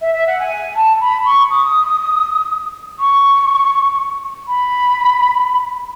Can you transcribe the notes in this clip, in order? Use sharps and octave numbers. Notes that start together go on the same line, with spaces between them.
E5
E5
F#5
G#5
A5
B5
C#6
D#6
C#6
B5